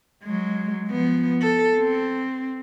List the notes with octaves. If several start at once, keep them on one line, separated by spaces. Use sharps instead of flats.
F#3 G#3
F3 B3
A4
C4